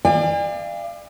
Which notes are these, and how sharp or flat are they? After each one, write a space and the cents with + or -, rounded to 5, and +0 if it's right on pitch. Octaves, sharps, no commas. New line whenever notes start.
D5 +30 F5 -30 G#5 -45